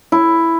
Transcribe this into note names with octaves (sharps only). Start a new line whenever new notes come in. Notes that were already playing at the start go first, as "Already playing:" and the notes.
E4